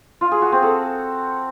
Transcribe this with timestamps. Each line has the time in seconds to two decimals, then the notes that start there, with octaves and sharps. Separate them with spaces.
0.21 F4
0.31 G#4
0.42 F#4
0.52 C4
0.63 A4